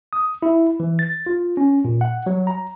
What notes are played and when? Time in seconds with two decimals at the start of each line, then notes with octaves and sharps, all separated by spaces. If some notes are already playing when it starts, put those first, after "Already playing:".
0.13 D#6
0.42 E4
0.80 E3
0.99 A6
1.26 F4
1.57 C#4
1.85 A#2
2.01 F#5
2.26 F#3
2.47 A#5